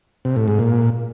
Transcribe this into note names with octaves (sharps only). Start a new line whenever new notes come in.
C3
A2
G#2
A#2